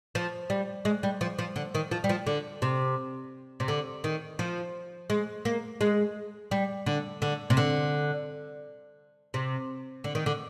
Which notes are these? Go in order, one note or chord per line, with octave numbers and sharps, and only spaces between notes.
F3
G3
G#3
G3
F3
F3
D3
D#3
F3
G3
F3
D3
C3
C3
D3
D#3
F3
G#3
A#3
G#3
G3
D3
D3
C3
D3
C3
D3
D#3
D3